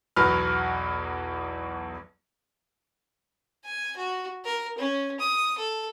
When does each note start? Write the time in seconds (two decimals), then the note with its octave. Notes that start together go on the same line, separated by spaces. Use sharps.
0.16 B1 E2 B2 F#3 B4 F6
3.65 G#5
3.97 F#4
4.45 A#4
4.78 C#4
5.20 D#6
5.58 A4